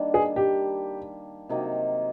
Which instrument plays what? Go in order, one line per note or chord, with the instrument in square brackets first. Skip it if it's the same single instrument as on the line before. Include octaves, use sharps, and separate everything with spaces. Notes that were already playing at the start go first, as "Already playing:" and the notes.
Already playing: [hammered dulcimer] D#3 G3 A#3 D4
[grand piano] G#4
G4
[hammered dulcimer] C3 D#3 F#3 A#3